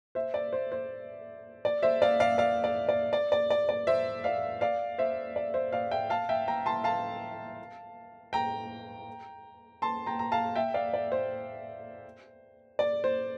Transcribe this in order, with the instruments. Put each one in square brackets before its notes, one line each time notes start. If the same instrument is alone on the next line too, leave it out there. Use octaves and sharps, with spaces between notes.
[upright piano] C5 E5
D5
C5
C5
D5
C5 E5
D5 F5
D5 F5
D5 F5
D5
D5
D5
D5
D5
D5
C5 E5
D5 F5
D5 F5
C5 E5
D5
C5 E5
D5 F5
E5 G5
F5 A5
E5 G5
G5 A#5
A5 C6
F5 A5
G5 A#5
A5 C6
G5 A#5
A#5
F5 A5
E5 G5
D5 F5
D5
C5
D5
C5